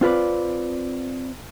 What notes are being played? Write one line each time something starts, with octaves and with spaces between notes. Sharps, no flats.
C4 F4 B4 D5